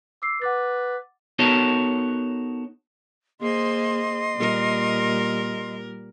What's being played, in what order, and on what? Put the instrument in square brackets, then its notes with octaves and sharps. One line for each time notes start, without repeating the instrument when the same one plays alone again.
[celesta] D6 E6 C7
[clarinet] B4 [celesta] F#5 D6 A6
[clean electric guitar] B3 D#4 F#4 A4 A#4 C#5
[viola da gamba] A#3 G#4 C5 [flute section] D#5 C6
[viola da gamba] A#2 G3 A#4